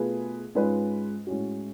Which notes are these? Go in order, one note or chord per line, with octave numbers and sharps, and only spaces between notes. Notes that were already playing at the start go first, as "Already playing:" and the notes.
Already playing: B2 A3 F4 G#4 B4
G#2 G#3 C#4 F4 B4
A2 G#3 C#4 F#4